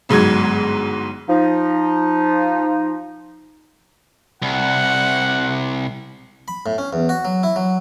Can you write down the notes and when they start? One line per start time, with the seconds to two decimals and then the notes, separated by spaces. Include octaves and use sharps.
0.09 G1 G#2 F#3 G#6
1.28 F3 D#4
4.42 C2 F#5
6.48 B5
6.66 A2
6.78 C#4
6.93 E2
7.09 F#4
7.25 F#3
7.43 E4
7.56 F#3